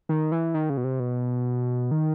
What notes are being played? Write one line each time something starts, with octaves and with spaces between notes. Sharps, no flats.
D#3
E3
D#3
C#3
B2
C3
B2
D#3